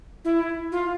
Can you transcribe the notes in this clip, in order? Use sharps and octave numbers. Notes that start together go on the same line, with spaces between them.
E4
F4